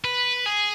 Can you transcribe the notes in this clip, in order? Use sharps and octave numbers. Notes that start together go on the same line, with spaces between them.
B4
G#4